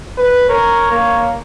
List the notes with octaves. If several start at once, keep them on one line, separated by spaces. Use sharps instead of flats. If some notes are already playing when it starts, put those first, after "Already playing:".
B4
A#4 C#5
A#3